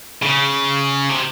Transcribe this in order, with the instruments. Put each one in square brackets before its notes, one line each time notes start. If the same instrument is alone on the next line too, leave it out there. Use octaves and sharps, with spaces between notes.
[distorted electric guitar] C#3
C3